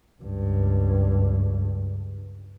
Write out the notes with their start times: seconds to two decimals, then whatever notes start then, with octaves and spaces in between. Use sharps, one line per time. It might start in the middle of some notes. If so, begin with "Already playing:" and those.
0.22 C#2 G2